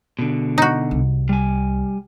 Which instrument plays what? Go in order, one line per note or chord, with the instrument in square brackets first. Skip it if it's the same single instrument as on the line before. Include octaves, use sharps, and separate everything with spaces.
[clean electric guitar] B2 D3
[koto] D#4 F#4
[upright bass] C2
[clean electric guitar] G3 G#5